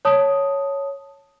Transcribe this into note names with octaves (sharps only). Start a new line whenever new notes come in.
C#5 A5 D#6